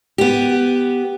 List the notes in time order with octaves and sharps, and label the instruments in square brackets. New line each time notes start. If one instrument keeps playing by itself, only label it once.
[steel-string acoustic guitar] B3 G4